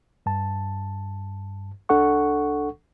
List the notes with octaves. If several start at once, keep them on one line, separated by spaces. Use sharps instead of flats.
G2 A5
C2 D4 A4 F#5 C#6